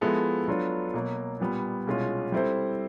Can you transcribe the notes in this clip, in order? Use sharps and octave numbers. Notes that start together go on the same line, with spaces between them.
F3 G#3 B3 E4 A4
F#3 B3 D4 F4 A4
B2 F#3 A#3
A#2 G3 B3
C2 B2 G#3 C#4 F4
G3 C4 E4 A4 C5